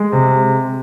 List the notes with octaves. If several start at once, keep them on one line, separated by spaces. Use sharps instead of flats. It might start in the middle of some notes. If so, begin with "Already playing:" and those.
Already playing: G#3
C3